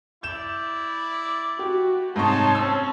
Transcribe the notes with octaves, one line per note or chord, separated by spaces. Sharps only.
E4 D5 G6 E7
F#4 G4
G#2 C3 D#4 C#5 A5 C6 C#6
C4 C#4 E6